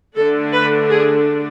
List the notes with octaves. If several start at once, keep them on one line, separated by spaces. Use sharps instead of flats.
D3 A3 D4 A4
B4
G#4